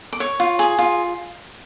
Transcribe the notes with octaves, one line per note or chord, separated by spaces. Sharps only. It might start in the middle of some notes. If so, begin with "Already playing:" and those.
D6
C#5 C#6
F4
G#4
F4